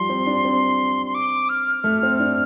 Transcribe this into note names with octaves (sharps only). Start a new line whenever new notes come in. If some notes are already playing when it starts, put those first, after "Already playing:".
Already playing: F3 G3 C6
C4
D4
C4
C6
D6
F6
A3
C4
D4